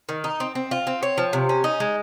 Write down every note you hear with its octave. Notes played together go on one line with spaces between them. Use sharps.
D#3
D#4
C4
C4
F4
C4
C#5
F3
C3
C#4
D#4
G#3